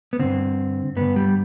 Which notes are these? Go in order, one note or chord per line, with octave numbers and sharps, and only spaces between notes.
B3
G2 D3 C4
G2 D3 B3
G3